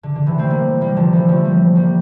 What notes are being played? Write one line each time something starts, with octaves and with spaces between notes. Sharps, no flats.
D3
D3
C3 E3
A3 C4
G3 A#3
G3 A#3
D3 F3
E3 G3
F3 A3
G3 A#3
G3 A#3